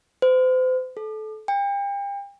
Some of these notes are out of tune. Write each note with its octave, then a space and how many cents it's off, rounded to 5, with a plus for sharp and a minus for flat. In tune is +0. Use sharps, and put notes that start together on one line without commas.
C5 -40
A4 -25
G5 +35